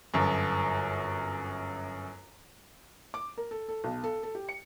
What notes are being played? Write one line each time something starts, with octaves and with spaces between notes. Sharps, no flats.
G1 F#2
D6
A#4
A4
A4
B1
A4
A4
G4
C#7